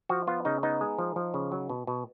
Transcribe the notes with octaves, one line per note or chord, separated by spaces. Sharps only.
F3 F#4
B3 F4
C#3 D#4
B3 D#4
G#3
F3
F3
C#3
F#3
B2
B2